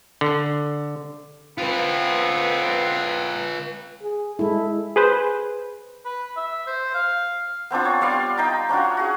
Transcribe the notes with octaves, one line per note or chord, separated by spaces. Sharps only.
D3
B3 C4 F4 B4
G#4
G#3 E4 A4
G#4 B4 C5
B4
E5
C5
F5
B3 C4 D4 F4
C#5
G3 B3 D5 F5
D#4 G5 A#5
C#4 D4 F4 F#4
F#4 G#4